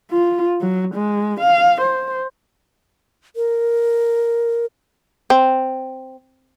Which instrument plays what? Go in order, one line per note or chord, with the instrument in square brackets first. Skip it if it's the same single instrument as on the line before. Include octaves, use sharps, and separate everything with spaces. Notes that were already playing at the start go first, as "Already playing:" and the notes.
[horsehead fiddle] F4
F#3
G#3
F5
C5
[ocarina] A#4
[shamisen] C4